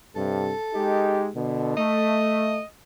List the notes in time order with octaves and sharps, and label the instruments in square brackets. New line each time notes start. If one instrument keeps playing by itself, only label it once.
[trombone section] G2 C3 [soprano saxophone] A4
[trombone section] G#3 D#4 G4
B2 D3
[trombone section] A3 [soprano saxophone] D#5